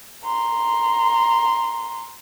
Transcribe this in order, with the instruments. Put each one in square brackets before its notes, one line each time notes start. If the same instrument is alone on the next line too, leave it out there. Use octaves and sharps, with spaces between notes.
[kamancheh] A#5 C6